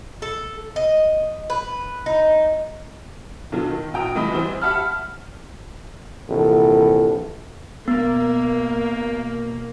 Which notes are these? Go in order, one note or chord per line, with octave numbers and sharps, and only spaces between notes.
A4
D#5
B4
D#4
B1 D3 F#3 F4
D#3
A#1 F#4 G5 A#5 D#6
C3 E3 A3 D#5 B5 D#6
E3 G3 B3 C4 E4 C5
G4 E5 F#5 A5 B5 F6
A#1 C3 E3 A4
B2 A#3 B3